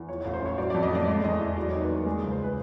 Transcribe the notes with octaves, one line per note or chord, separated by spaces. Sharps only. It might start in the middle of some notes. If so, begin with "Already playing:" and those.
Already playing: E2
F3 C#5
A1 C#5
C5
A1 C#5
F#3 D5
F2 D5
D#5
A3 D5
G#3 D#5
E2 D#5
E2 E5
F#3 D5
D#2 C#5
B4
D#2 A#4
G#3 G#4
C#2
C5
B4